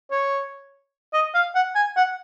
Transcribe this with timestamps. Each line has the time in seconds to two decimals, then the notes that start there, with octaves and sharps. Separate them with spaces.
0.11 C#5
1.14 D#5
1.34 F5
1.55 F#5
1.75 G#5
1.96 F#5